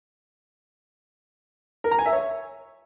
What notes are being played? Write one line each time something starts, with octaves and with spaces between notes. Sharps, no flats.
A#4
A#5
G#5
E5
C#5